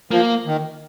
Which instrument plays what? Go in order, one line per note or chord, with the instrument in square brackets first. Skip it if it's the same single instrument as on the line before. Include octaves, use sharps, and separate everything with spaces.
[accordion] F3 [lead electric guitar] A#3
[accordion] D#3